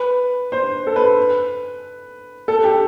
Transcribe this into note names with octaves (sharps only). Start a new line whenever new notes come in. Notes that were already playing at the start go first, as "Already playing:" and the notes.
Already playing: B4
C5
A4
B4
A4
G4